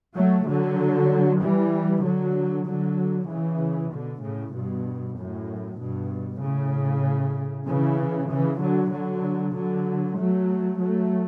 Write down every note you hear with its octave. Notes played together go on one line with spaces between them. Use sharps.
F#3 A3
D3 F#3
E3 G3
D3 F#3
D3 F#3
C#3 E3
B2 D3
A2 C#3
G2 B2
F#2 A2
G2 B2
A2 C#3
C#3 E3
C#3 E3
D3 F#3
D3 F#3
D3 F#3
F#3 A3
F#3 A3